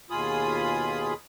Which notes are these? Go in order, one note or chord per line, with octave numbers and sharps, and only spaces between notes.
D#2 B2 F4 G#4 B5 D#6